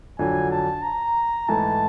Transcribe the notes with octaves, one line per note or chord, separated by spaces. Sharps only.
F2 D3 F#3 G#5
A5
A#5
G#2 E3 A3 A5